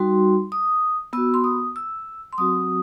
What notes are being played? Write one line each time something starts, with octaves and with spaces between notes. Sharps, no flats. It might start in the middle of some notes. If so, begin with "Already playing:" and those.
Already playing: G3 D#4 F#4 C6
D#6
B3 F#4 E6
C6
D#6
E6
C6
F#3 C4 F#4 D#6